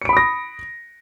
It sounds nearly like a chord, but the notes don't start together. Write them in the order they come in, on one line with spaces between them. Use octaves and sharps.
C#7 D7 B5 D#6 A#6